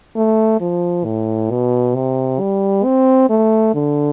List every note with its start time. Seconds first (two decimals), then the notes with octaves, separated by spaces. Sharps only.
0.16 A3
0.61 F3
1.05 A2
1.51 B2
1.95 C3
2.40 G3
2.85 C4
3.30 A3
3.75 D3